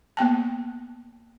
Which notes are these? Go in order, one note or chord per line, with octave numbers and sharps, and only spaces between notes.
A#3 B3 G5 A5